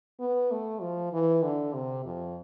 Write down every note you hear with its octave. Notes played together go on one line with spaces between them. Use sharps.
B3
A3
F3
E3
D3
C3
F2